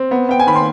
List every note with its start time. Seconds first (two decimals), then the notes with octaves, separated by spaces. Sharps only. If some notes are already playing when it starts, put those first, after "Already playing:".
Already playing: C4
0.11 B3
0.29 B3 G5
0.40 G#5
0.47 D#3 B5
0.56 C6